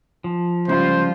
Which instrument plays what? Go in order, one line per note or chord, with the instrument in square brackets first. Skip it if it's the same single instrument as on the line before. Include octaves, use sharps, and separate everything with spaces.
[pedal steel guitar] F3
[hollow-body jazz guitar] D2 G#2 C#3 [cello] G3 F4 [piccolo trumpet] C5